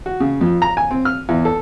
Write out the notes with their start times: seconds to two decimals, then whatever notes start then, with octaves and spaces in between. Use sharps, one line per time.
0.06 F#4
0.20 C#3
0.41 F2
0.62 A#5
0.77 G#5
0.91 C4
1.05 F6
1.29 E2
1.45 A4